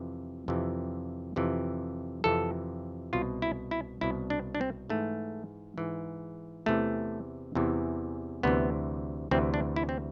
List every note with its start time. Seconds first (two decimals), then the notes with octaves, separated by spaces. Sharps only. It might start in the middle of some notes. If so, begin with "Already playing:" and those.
Already playing: F2 C3 E3
0.48 F2 C3 E3
1.36 F2 C3 E3
2.24 F2 C3 E3 A4
3.13 C2 B2 F4
3.42 E4
3.71 E4
4.01 C2 B2 E4
4.30 D4
4.55 D4
4.61 C4
4.90 G#2 E3 A3
5.78 G#2 E3
6.66 E2 C3 E3 A3
7.55 E2 C3 E3
8.43 D2 C3 E3 B3
9.31 D2 C3 E3 C4
9.54 D4
9.76 E4
9.89 C4